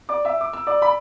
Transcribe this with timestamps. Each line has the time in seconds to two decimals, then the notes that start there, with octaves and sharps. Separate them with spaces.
0.09 D5 D6
0.25 E5 E6
0.41 D6
0.53 E6
0.67 D5 D6
0.82 B5